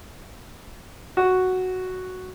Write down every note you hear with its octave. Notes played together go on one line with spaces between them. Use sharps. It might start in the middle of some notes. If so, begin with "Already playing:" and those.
F#4